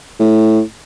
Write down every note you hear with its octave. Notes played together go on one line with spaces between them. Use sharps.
A2